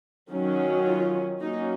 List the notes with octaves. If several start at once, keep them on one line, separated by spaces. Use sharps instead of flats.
D#3 F#3 C#4
F4
F#3 A#3 C#4 D#4